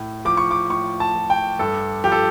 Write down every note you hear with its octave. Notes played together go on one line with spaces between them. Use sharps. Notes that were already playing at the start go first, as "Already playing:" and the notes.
Already playing: A2
F3 D6
C#6
D6
A2 C#6
A5
F3
G5
G2 A4
F3 G4
A4